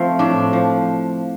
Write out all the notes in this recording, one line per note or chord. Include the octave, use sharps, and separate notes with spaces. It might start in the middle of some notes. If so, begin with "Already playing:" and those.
Already playing: F3 A3 C4
A2 D4
F3